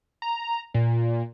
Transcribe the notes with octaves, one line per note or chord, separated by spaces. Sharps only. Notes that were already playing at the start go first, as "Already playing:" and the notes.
A#5
A#2